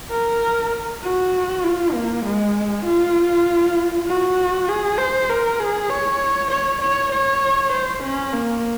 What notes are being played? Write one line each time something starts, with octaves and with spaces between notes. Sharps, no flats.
A#4
F#4
F4
A#3
G#3
F4
F#4
G#4
C5
A#4
G#4
C#5
C#5
C#5
C#5
C5
C#4
A#3